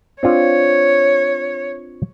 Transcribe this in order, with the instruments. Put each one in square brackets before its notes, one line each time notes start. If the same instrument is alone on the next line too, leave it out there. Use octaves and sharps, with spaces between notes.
[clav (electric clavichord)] C4 D4 F4 [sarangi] C#5